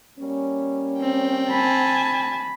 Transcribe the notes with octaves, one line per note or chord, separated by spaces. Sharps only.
G3 A#3 C#4
C4 G5
G#5 A5 B5